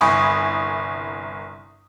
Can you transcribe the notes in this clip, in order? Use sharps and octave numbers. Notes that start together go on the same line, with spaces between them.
G1 C2 G#5 B5 C#6 D#6